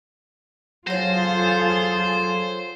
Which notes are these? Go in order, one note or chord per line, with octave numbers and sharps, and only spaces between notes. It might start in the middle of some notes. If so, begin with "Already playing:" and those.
F#3 F4 G#4 A4 C5 C#5